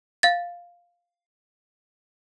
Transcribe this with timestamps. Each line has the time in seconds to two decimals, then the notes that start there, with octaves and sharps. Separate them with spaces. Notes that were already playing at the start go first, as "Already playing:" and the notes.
0.23 F5 A6